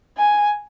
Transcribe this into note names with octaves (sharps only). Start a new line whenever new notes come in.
G#5